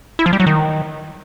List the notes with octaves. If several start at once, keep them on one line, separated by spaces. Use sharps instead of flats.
E4
F3
G3
F#3
D#3